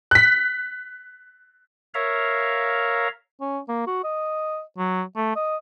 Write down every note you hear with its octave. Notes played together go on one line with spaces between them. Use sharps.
F#6 B6
A#4 C#5 E5 F5 A#5
C#4
A#3
F#4
D#5
F#3
A3
D#5